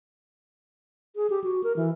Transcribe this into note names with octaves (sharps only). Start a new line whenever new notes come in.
G#4
G4
F#4
A#4
E3